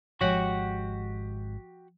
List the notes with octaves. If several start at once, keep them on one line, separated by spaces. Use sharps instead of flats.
G#1 F3 G#3 F#4 G4 C#5 F#5